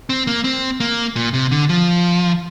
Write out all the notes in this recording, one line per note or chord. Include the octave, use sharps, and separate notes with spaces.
C4
A#3
C4
A#3
A#2
C3
D3
F3